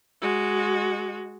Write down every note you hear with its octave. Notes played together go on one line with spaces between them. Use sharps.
G#3 F#4